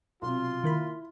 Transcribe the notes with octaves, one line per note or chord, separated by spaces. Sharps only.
B1 C3 F4 C6
D#3 A#3 E4 B5